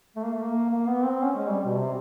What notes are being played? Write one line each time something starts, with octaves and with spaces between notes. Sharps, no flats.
A3
A#3
A3
A#3
A#3
B3
C4
C#4
G#3
G3
B2
C3